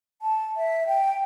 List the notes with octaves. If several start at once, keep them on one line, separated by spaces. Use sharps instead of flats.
A5
E5
G5